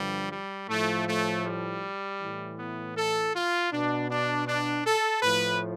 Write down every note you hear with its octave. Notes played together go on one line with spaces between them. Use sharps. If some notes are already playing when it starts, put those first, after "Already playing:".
Already playing: G2 D3 F3 G3
G3
A2 F3 A3
A3
G3
A2 E3
B3
A4
F4
B2 D4
D4
D4
A4
A2 F3 B4